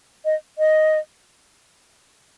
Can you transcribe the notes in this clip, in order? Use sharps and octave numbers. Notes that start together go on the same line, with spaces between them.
D#5
D#5